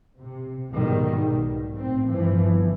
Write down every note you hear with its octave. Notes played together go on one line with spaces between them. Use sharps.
C3
G#2 B2 D#3 G3
B1
A2 C4
G2 E3 F3
G1